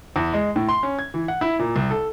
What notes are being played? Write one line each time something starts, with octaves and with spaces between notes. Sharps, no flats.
E2
G#3
A2
C6
C#4
G#6
E3
F#5
E4
A#2
C2
A4